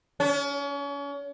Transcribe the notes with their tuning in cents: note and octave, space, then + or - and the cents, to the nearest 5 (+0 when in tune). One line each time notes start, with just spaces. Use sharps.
C#4 +35